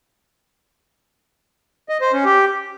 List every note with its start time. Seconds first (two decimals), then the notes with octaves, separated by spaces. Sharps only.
1.89 D#5
2.01 C5
2.13 C#4
2.24 G4